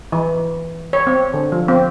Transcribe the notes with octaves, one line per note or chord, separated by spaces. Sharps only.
E3
C#5
C4
D3
F3
C4